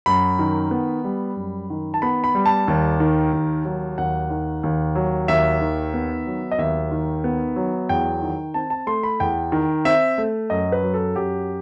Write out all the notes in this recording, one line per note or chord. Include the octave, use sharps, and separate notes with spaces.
F#2 B5
D#3
B3
G3
F#2
D#3
A5
B3 B5
B5
G3
A5
D#2
D#3
D#2
F#3
D#2 F#5
D#3
D#2
F#3
D#2 E5
D#3
B3
F#3
D#5
D#2 E5
D#3
B3
F#3
E2 G5
D#3
C4 A5
A5
A3 C6
B5
E2 G5
D#3
C4 E5
A3
F#2 D#5
B4
F#3
A4
F#2 G4